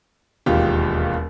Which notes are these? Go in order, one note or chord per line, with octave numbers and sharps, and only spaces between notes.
E1 D#2 F4 G4